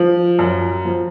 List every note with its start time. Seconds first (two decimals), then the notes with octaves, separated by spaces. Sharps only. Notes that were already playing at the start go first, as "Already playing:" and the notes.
Already playing: F3
0.39 F#2
0.85 F3